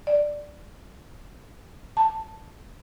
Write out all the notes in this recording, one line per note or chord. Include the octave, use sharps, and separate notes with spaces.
D5
A5